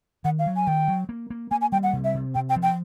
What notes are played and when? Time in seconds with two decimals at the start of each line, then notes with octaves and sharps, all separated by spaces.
0.24 D#3 F#5
0.39 F5
0.46 F#3
0.56 G#5
0.67 D#3 G5
0.88 F#3
1.09 A#3
1.30 A#3
1.51 A#3 G#5
1.61 G#5
1.72 G3 G5
1.83 F#5
1.93 C3
2.04 E5
2.14 C3
2.35 C3 G5
2.49 G5
2.56 F3
2.63 G5